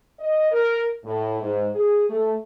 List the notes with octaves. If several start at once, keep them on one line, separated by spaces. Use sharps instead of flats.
D#5
A#4
A2
G#2
G#4
A3